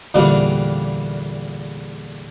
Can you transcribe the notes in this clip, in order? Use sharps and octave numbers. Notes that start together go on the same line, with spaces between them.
E2 A#2 D3 G3 C4